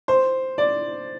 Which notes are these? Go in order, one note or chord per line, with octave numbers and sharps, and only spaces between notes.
C5
D5